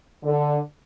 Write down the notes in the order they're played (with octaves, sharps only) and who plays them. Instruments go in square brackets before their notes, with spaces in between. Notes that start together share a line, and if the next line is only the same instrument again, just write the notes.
[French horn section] D3